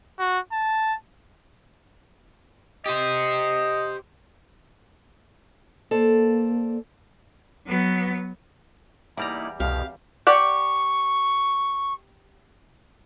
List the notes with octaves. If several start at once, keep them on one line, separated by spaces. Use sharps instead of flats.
F#4
A5
G4 C5 D#5
A#3 A4 C5 D5
F#3 B3
E2 G3 A#3 D#4 E4 D5 A#5
C2 F2 B2 G4 F5
G4 D5 F#5 C#6